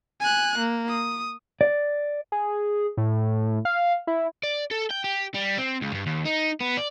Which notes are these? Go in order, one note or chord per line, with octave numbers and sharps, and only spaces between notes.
G#5 F#6
A#3
D#6
D5
G#4
A2
F5
E4
D5
A4
G5
G4
G3
C4
C#2
G2
D#2
D#4
B3
D5